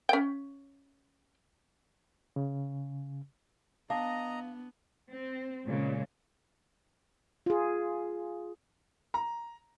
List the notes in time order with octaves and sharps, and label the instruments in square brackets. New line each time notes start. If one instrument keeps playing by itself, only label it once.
[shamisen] C#4 G5
[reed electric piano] C#3
[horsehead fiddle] B3 [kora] D4 [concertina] D#5 A#5 [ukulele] F5
[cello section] C4
A#2 C#3 G#3
[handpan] F4 G#4
[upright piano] A#5